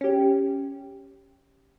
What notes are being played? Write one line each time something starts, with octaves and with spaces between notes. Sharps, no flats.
C#4 G4